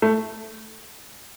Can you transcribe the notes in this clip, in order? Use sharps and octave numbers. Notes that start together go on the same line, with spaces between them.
A3